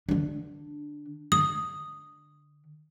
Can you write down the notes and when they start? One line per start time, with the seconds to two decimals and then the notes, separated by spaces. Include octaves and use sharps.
0.09 D3 D4
1.32 D3 D#6